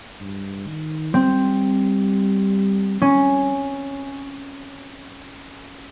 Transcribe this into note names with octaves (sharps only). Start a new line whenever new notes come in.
G2
D#3
G3 C4
G3 C#4